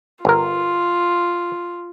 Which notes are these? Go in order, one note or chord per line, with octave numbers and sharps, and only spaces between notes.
G1 F4 A#4